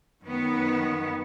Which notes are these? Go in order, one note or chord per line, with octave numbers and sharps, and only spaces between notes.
F#2 D#3 B3